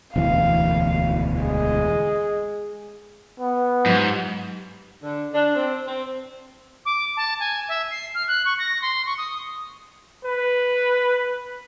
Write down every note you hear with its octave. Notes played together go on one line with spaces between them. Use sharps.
E1 D2 E3 F5
G#3
B3
G#2 F#3 F4 G4
D3
D4
C4
C4
D6
A5
G#5
E5
C7
F6
F#6
C#6
A#6
C6
C#6
D#6
B4